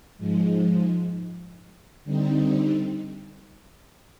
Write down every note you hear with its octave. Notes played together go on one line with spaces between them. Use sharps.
G#2 F3 G#3
D3 G3 C4 D#4